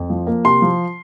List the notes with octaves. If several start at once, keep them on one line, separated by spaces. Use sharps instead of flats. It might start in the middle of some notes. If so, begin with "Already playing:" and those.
Already playing: F2
F3
A#3
C3 C6
F3